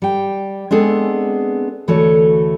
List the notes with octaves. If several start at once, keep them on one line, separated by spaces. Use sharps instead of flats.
G3 G5
G#3 B3 C4 D4 G#4 A4
D2 E3 A3 F#4 A4 C#5